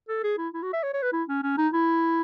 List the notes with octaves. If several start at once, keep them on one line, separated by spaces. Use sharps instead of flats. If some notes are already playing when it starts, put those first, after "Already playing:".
A4
G#4
E4
E4
F#4
E5
C#5
C#5
B4
E4
C#4
C#4
D#4
E4